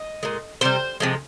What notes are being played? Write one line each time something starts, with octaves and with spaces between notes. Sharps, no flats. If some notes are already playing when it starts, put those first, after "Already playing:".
Already playing: D#5
A#2 G#3
C3 G3 C5
C3 F3 G#3